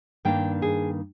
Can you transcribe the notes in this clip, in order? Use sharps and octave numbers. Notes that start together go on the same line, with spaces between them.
G2 D#3 A#3 D4 G5
G#4